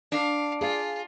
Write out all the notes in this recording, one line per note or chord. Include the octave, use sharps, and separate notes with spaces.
D4 F5
F4 G#4 F5 G#5